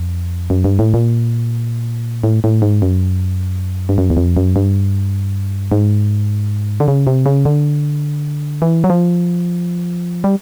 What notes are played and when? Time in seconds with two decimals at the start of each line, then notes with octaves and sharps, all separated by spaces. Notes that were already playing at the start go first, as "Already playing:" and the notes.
Already playing: F2
0.50 F#2
0.64 G2
0.79 A2
0.94 A#2
2.24 A2
2.44 A2
2.62 G#2
2.82 F#2
3.89 G2
3.98 F#2
4.10 E2
4.17 F2
4.37 F#2
4.56 G2
5.72 G#2
6.80 D3
6.88 C#3
7.07 C3
7.26 C#3
7.45 D3
8.62 E3
8.84 F#3
8.90 F3
10.24 G3